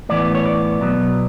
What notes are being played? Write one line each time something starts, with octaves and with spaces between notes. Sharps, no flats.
A2 E3 B3 D5
C#5
D5
B2 F#3 B3